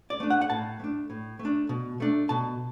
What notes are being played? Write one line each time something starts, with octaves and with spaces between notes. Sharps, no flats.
D5
A3 D4
F#5
F#5
A2 A5
A3 D4
A2
A3
D4
B2
A3 D4
B2 A5